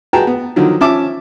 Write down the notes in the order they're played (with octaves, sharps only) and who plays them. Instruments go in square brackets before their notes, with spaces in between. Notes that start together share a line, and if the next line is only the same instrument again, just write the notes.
[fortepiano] F#4 G#4 B4 G5 A5 A#5
B3
D3 D#3 F3 F#3
F3 C#4 E5 A5 D6